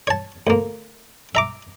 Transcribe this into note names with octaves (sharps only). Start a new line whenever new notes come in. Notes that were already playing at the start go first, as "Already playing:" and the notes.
C#5 A5
D2 A#3
E5 A#5 D6